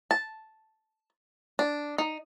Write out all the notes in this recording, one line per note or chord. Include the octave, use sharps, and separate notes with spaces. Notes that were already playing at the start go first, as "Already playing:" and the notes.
A5
D4
D#4